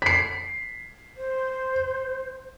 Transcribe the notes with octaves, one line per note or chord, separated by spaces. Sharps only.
B6 C7
C5